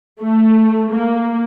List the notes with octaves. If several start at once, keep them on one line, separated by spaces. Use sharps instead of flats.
A3
A#3